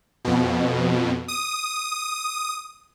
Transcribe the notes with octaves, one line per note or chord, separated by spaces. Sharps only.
F2 B2
D#6